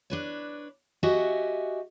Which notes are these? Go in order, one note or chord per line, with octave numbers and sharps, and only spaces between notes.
D4 B4 C#5
F#4 G4 D#5 E5 F#5 G#5